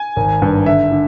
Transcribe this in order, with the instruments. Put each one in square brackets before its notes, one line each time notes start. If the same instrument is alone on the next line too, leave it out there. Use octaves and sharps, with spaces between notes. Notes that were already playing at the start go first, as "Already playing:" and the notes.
Already playing: [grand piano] G#5
G#1
G2
D3 E5
D3